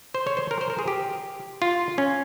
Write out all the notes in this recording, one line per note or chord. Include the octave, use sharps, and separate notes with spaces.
C5
C#5
C5
A#4
C5
A#4
G#4
G4
F4
C#4